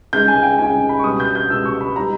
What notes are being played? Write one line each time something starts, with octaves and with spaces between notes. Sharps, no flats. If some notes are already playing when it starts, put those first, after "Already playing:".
C#2 C#3 G#3 D#4 G6
G#5
G5
C#2 C#3 G#3 D#4 G#5
B5
C#6
C#2 B2 G3 D#6
G6
G6
C#2 B2 G3 E6
C#6
B5
G3 B3 D#4 A#5